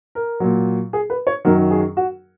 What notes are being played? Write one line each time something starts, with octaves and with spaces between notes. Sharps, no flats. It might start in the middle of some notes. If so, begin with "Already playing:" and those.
A#4
A#2 F#3
G#4
B4
C#5
F#2 D#3 F#3 A#4
G#4
F#4